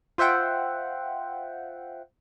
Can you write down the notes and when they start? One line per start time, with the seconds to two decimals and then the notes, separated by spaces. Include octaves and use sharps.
0.18 F4 C5 E5 F#5 G5